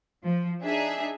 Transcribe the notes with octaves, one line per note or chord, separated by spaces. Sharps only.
F3
D4 D#4 G#4 E5